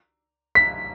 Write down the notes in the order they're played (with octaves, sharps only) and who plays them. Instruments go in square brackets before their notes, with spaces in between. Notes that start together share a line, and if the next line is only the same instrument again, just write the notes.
[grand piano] B6